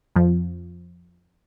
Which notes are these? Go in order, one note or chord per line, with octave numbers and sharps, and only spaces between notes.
F2 F3